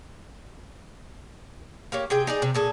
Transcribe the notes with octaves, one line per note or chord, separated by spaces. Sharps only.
A#3 G4 C#5
C3 G#4 G5
D#4 G#4 D5
C3
A#2 G#4 A4